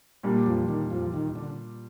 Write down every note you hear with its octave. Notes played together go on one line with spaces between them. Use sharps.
A#2 G3 D4
F2 F3
D#2 D#3
F2 F3
D#2 D#3
D3